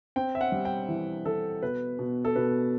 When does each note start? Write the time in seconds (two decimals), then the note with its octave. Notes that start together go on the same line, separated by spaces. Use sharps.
0.16 C4 G5
0.35 E5
0.41 F#5
0.52 G3
0.65 G5
0.88 E3
1.26 E3 A4
1.62 B2 B4
1.99 B2
2.25 A4
2.35 B2 B4